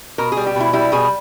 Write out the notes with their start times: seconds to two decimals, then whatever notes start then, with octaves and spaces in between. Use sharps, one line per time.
0.18 B2 A#4
0.32 G3 G#4
0.47 G4
0.56 B2 E4
0.73 G3 E4
0.92 B2 G#4